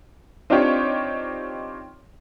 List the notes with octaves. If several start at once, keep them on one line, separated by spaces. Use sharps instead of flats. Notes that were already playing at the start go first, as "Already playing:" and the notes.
C4 D4 D#4 F4 G4 C#5